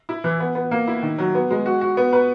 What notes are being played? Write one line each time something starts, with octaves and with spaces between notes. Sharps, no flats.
E4
E3
B3
B3
A#3
E4
D#3
F#3
B3
G#3
F#4
F#4
B3
B4